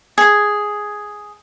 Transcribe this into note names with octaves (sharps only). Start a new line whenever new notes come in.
G#4